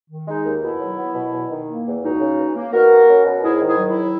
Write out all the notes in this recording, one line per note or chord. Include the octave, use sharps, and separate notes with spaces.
D#3
G#3 D#4
D#2
B2 E4
F#3
B3
B2
E2
D#3
A#3
E2
C#2 D#4 F#4
C#3
E3
A#3
B2 F#4 A#4
A#3
C#4
B2
G#2 E4 G#4
D#3
E4 G#4
F#3
E4